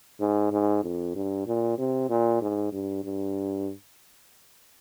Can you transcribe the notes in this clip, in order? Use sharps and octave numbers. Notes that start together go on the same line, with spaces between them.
G#2
G#2
F2
G2
A#2
C3
A#2
G#2
G2
G2